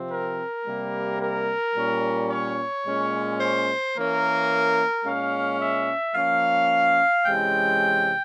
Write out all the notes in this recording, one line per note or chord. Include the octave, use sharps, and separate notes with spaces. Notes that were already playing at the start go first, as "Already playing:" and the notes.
Already playing: C3 F3 C4
A#4
C3 G3 A#3
A#4
A#2 G3 C#4
C#5
A#2 G#3 C#4
C5
E3 A#3 C#4 A#4
A#2 G#3 C#4 F5
E5
F3 A#3 C#4 F5
C3 E3 G#3 C#4 G5